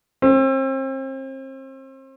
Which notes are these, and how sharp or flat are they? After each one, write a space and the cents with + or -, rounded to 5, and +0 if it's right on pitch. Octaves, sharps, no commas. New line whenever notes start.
C4 +35